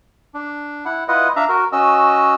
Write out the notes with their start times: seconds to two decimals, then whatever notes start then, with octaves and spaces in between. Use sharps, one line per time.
0.34 D4
0.85 E4 F#5
1.08 E4 F4 B4 D#5 F#5
1.36 D4 E5 F5 A#5
1.49 F#4 A#4
1.72 C#4 F#4 D#5 E6